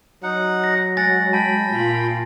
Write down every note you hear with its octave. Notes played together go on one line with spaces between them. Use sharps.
F#3 D#4 F#5
A#6
G#3 F#5 G#5 A6 A#6
G5 A5 B5
A#2 F4